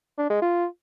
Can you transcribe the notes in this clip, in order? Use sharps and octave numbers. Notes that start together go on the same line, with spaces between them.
D4
G#3
F4